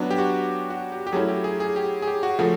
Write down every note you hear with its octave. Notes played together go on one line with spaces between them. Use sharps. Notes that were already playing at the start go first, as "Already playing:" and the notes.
Already playing: F#3 B3 D4
G4
F#4
F#4
G4
G4
F#3 A3 C#4 E4 G#4
G4
G#4
G#4
G4
G#4
G4
F#4
C#3 F3 A3 F#4